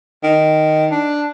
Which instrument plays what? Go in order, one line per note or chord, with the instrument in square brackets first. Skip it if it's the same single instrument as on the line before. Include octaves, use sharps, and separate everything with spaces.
[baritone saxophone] D#3
D4